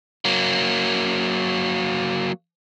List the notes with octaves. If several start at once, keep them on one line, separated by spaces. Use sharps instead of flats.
F#3 A#3